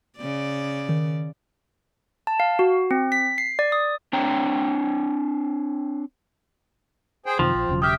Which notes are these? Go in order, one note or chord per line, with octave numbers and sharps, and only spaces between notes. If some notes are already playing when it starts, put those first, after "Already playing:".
C#3 D5
D#3
A5
F5
F#4
C4
B6
C7
D5
D#6
C4 D4 C#5 G5 A#5
G#4 C5 G5
F#2 C3 D#3 F3 C4
A#1
E1 C#3 F#3
G4 E5 G5 D#6 F6